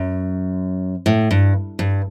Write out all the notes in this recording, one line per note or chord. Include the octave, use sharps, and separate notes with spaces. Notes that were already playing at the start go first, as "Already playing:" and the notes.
Already playing: F#2
A2
G2
G2